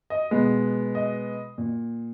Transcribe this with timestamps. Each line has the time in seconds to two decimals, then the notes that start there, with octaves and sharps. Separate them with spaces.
0.10 D#5
0.31 B2 G#3 B3
0.95 D#5
1.58 A#2